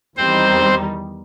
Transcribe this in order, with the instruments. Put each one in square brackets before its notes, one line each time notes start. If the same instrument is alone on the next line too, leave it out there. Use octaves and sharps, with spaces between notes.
[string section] E2 D#3 G3 D#4 [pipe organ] C4 C5